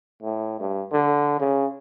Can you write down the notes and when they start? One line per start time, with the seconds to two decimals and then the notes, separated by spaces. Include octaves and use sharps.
0.23 A2
0.60 G2
0.92 D3
1.40 C#3